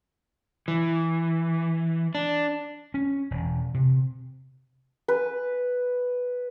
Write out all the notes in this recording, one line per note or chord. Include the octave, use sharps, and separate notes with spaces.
E3
D4
C#4
E1
C3
B4